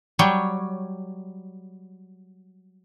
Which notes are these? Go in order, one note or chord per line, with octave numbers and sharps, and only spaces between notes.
F#3 G3 C#5